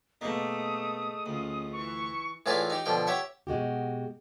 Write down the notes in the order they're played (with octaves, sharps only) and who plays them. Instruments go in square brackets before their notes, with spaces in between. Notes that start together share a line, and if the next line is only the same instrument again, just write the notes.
[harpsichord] B2 A#3 [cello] A3 [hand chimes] G#4 D#5 [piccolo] D#6
[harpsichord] D2 [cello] C#4 F4
[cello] E3 [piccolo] C#6
[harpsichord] A2 E3 F4 G#4 B4 D5
D#4 G4
B2 D3 F3 G5
G4 C#5 E5 F#5
[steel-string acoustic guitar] B2 G#3 F#4 G4